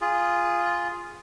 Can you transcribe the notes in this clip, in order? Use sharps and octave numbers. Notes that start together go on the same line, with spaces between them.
F4 G#4